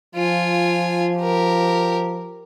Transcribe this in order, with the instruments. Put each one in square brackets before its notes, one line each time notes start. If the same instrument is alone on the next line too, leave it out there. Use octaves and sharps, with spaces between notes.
[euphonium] F3 [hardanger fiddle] F4 G#5
[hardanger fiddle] G4 A#4